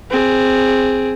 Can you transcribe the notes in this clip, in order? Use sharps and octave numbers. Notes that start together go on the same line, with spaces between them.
C4 G#4